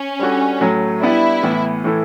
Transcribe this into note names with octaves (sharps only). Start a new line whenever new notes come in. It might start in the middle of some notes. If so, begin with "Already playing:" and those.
Already playing: C#4
G3 D4 F#4 A4
A2 F#3 A3
G3 B3 D4 E4
A2 E3 B3
A2 E3 A3 E4 A4